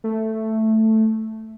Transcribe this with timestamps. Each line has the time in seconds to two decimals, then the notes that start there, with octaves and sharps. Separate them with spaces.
0.04 A3